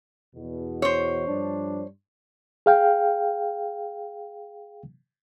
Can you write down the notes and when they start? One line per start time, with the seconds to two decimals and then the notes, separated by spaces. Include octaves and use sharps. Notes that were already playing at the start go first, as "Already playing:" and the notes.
0.36 E2 B2
0.82 C5 C#5
1.27 G2 F3 D4
2.66 G#4 F5 G5